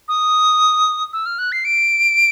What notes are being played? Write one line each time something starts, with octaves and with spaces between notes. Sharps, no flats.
D#6
E6
F6
F#6
C7
D7